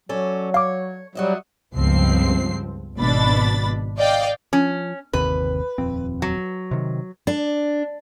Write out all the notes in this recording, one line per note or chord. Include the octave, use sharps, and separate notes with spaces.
F#3 C#4 A4 D5
C#5 F5 D6
F#3 G3 F#4 D#5 E5
C#2 G2 F3 B3 C4 C7
G#1 B2 D4 B5 A6
D5 D#5 F5 G5
F3 C#4
G1 D#2 C3 B4
D#1 F2 C4
F#3
C3 D#3
D4